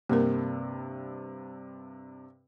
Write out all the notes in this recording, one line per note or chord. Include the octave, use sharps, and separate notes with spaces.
G2 C3 A#3 A#4